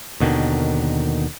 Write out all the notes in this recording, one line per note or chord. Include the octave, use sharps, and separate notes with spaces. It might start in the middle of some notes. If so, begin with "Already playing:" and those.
D#2 B2 D3 D#3